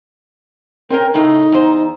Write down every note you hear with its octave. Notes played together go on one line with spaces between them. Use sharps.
C4 C#4 A#4 G5
A2 C#3 A3 D#4
E2 C5